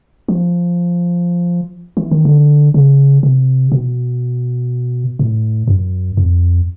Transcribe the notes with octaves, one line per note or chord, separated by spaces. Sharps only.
F3
E3
D#3
D3
C#3
C3
B2
A2
F#2
F2